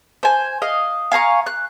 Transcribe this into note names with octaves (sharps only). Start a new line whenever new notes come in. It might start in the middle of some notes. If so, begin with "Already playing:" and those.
C5 G#5
D#5 F5
F5 G#5 A#5 C#6
F#6